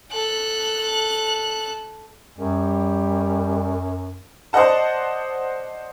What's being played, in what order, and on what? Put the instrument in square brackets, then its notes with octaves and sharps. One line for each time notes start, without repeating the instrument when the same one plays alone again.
[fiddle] A4 F#6
[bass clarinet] F#2 [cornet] G3
[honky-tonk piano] C5 D5 D#5 F#5 A5